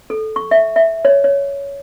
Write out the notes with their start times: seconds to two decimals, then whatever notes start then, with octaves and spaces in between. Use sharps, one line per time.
0.10 A4
0.36 C#6
0.51 E5
0.76 E5
1.05 C#5
1.24 C#5